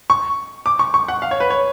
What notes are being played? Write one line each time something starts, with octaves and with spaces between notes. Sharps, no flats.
C#6
D6
C#6
C#6
F#5
F5
C#5
B4
C#5